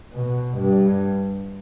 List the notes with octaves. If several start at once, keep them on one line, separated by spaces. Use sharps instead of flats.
B2
G2